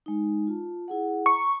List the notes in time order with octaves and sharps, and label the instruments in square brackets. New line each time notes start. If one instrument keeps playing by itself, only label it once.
[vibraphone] G#3 D#4
F4 A5
E4 G#4 F#5
[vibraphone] A#5 [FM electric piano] C#6